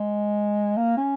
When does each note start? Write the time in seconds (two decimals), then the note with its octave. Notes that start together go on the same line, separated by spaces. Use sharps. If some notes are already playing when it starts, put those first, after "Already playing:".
Already playing: G#3
0.77 A#3
0.97 C#4